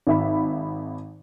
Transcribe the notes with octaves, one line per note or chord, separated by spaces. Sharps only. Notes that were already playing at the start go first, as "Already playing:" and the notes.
G#1 E5 B5